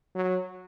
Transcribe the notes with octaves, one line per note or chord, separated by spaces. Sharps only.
F#3